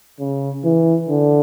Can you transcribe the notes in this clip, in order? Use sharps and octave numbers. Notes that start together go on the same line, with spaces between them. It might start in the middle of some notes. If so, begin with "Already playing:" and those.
C#3
E3
D3